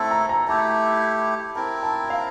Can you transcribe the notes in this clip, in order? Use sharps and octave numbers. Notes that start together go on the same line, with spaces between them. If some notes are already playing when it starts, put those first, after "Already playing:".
Already playing: A3 C4 E4 A4 A5
A#5
A#5
A3 E4 G4 A5
C4 E4 A#4 A5
A5
F5